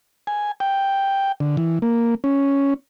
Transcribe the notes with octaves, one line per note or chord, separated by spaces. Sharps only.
G#5
G5
D3
E3
A#3
C#4